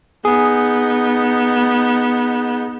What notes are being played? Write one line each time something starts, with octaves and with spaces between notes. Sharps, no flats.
B3 D#4 G#4